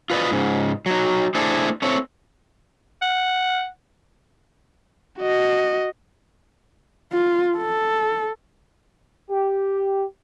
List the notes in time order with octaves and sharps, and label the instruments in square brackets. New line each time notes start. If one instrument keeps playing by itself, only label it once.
[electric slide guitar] F4 B4 D5 D#5
G#2 C#3
F#3 D#4
A3 D4 E4 G#4 A4 C5
A3 C4 C#5
[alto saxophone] F#5
[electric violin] F#4 D#5
[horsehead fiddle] F4
A4
[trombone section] G4